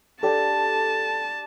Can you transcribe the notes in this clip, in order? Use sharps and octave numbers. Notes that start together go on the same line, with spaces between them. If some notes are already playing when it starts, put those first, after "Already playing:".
D4 G4 A4 G5 A5